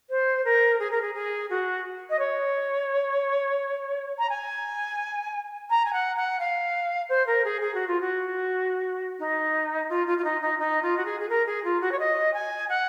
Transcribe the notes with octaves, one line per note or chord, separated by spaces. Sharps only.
C5
A#4
G#4
A#4
G#4
G#4
F#4
D#5
C#5
A#5
G#5
A#5
G#5
F#5
F#5
F5
C5
A#4
G#4
G#4
F#4
F4
F#4
D#4
F4
F4
F4
D#4
D#4
D#4
F4
F#4
G#4
G#4
A#4
G#4
F4
F#4
C#5
D#5
G#5
F#5